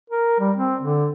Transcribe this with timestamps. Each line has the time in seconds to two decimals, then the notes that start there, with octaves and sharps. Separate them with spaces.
0.10 A#4
0.40 G3
0.56 C4
0.81 D3